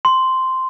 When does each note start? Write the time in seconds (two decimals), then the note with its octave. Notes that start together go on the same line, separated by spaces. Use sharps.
0.05 C6